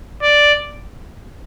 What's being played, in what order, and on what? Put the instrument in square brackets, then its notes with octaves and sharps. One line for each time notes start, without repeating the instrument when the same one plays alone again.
[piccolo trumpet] D5